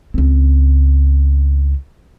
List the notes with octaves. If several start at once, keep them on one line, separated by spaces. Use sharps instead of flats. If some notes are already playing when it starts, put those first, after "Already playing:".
C#2 C4